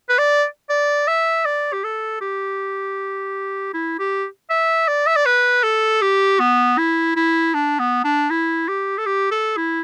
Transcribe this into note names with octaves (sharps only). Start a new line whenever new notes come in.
B4
D5
D5
E5
D5
G4
A4
G4
E4
G4
E5
D5
E5
D5
B4
A4
G4
B3
E4
E4
D4
B3
D4
E4
G4
A4
G4
A4
E4